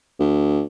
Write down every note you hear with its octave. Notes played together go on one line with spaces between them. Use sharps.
D2